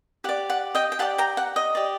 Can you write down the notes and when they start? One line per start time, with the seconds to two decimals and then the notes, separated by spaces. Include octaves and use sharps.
0.24 G4 F#5
0.29 D5
0.50 F#5
0.75 D#5 G5
0.92 G5
0.99 G4 D5 F#5 A5
1.18 G5 A#5
1.37 F#5
1.56 D#5
1.75 G4 D5